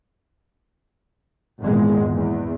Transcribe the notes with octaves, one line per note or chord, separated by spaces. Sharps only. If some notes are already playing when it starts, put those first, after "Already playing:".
G#1 E2 A#2 G#3
E2